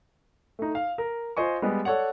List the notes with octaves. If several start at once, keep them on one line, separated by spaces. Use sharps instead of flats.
A3 D#4
F5
A#4
F4 C5 D#5 G#5 C#6
G3 G#3 B3 D#5
A4 C#5 D5 F#5